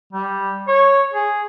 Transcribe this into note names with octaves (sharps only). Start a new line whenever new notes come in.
G3
C#5
G#4